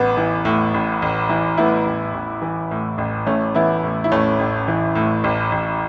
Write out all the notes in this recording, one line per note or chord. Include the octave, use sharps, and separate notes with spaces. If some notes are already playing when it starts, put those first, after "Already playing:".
Already playing: A1 B3
E3
A2
A1
A1
E3
A2 B3 E4
A1
A1
E3
A2
A1
A1 A3 C#4
E3 B3 E4
A2
E4
A1 A3 C#4
A1
E3
A2
A1
A1